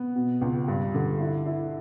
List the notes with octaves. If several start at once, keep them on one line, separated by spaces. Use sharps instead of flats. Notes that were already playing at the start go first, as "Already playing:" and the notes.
Already playing: B3
B2
C#2
G2
D3
E4
E4